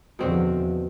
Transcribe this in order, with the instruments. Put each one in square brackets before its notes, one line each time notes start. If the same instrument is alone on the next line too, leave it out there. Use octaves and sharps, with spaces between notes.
[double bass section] E2 D3 F3 [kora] B2 C4 F#4